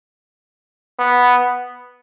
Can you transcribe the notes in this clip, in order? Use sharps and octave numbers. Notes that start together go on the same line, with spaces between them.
B3